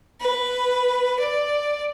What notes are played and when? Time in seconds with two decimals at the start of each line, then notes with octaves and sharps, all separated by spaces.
0.21 B4
1.19 D5